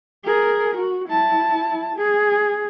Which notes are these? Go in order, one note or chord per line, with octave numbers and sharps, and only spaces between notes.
G#4 A#4
F#4
E4 A5
G#4